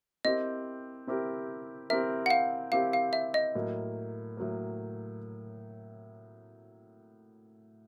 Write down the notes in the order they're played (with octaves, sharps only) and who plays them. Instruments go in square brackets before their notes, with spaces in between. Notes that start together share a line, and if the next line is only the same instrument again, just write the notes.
[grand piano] C4 E4 G4 A#4 [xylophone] D#5
[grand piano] C4 E4 G4 A#4
[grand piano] C4 E4 G4 A#4 [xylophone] E5
[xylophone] F#5
F5
[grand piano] C4 E4 G4 A#4 [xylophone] F5
[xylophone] F5
E5
D#5
[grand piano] A2 F#3 A#3
A2 F#3 A#3